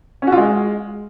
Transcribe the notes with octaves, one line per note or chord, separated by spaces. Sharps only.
C#4
F#4
F4
G#3